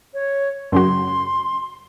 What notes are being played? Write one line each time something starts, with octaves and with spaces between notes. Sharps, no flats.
C#5
F#2 C#3 F#4 C6